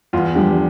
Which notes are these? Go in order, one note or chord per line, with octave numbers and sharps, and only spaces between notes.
E2 F4
D3 F3 G4